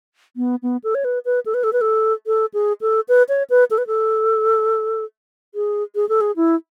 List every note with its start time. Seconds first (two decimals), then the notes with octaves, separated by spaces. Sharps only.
0.37 B3
0.63 B3
0.84 A4
0.95 C#5
1.05 B4
1.25 B4
1.46 A4
1.54 B4
1.64 A4
1.73 B4
1.81 A4
2.27 A4
2.54 G#4
2.81 A4
3.09 B4
3.29 C#5
3.50 B4
3.71 A4
3.78 B4
3.87 A4
5.55 G#4
5.95 G#4
6.09 A4
6.21 G#4
6.36 E4